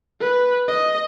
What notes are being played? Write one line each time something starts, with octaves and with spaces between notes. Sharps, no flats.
B4
D#5